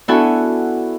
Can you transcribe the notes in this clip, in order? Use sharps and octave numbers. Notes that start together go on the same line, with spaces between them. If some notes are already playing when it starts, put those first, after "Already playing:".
B3 D4 E4 F#4 A4 G#5